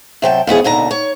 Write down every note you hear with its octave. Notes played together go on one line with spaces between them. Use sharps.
C3 F#3 G5 A5
F2 E3 B3 G#4
D#2 B2 D3 A#5
C#5